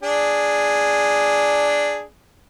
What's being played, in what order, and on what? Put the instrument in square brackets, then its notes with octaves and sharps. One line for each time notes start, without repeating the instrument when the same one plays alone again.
[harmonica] D4 G#4